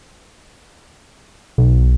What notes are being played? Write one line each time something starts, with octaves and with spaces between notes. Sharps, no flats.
B1